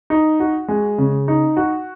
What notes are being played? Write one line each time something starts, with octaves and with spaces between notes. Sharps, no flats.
D#4
F#4
G#3
C#3
D#4
F#4